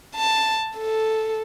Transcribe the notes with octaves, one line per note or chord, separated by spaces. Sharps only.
A5
A4